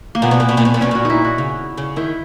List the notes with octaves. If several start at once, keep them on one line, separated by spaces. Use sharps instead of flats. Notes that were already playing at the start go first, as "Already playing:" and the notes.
A#3
A#2 B3
B2
A#2
B2
A#2
B2
A#2
B2 C#4
A#2 F#4
D#4 E4
F#4
C#3
C#3
D#3 E4